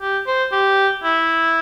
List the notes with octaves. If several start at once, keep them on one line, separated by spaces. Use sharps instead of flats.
G4
C5
G4
E4